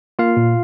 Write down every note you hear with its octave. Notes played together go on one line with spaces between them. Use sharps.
A#3 F4 F5
A#2